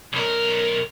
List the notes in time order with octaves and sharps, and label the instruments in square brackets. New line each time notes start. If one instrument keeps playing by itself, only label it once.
[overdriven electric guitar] B1 A#4